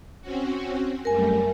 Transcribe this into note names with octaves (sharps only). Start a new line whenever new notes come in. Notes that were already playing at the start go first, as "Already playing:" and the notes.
C4 C#4 F#4
F#2 G3 A3 A#4 G#5